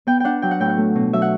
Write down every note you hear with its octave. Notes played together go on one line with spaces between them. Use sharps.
B3 G5
D4 F#5 G5
F#3 G5
F#5
A2 G5
F#5
A3
B2
F#3 E5
F#5